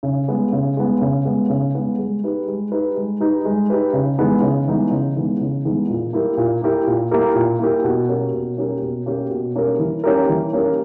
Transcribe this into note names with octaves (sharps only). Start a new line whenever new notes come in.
C#3
G#3 B3
C#3
G#3 B3
C#3
G#3 B3
C#3
G#3 B3
G#3
D#4 G4 B4
G#3
D#4 G4 B4
G#3
D#4 G4 B4
G#3
D#4 G4 B4
C#3
E3 G#3 B3 D#4
C#3
E3 G#3 B3 D#4
C#3
E3 G#3 B3 D#4
C#3
E3 G#3 B3 D#4
A#2
A#3 E4 G4 A#4
A#2
A#3 E4 G4 A#4
A#2
A#3 E4 G4 A#4
A#2
A#3 E4 G4 A#4
B2
A#3 C#4 G4 A#4
B2
A#3 C#4 G4 A#4
B2
A#3 C#4 G4 A#4
B2
A#3 C#4 G4 A#4
E3
A#3 C#4 G4 A#4
E3
A#3 C#4 G4 A#4